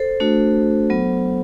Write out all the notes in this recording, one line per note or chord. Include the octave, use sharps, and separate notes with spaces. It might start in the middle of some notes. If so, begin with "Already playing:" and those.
Already playing: A4 C5
A3 D4 F#4
F#3 B3